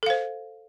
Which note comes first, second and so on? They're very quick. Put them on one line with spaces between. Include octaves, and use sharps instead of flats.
A4 F5 C5